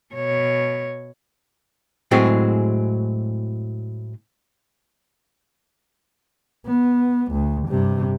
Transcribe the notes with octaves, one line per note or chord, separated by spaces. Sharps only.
B2 C#5
A2 F#3 G#3 C4 F#4 G#4
B3
D2
G2 C3